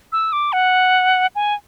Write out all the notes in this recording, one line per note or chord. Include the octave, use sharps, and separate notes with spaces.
E6
D6
F#5
G#5